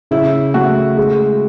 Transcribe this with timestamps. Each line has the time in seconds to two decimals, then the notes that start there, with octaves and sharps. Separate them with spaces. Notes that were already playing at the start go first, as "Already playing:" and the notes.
0.11 C#3 E4
0.54 A3 F#4
0.97 G#3